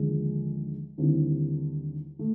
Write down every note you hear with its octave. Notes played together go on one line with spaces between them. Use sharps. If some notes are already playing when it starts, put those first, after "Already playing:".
Already playing: D#2 D3 F3 G#3
D#2 D3 G3 C4 E4
A3